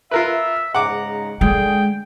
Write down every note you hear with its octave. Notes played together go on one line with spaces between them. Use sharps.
F4 A#4 B4 E5
G#2 C#3 F#5 A#5 D6
D3 G#3 G#4 G5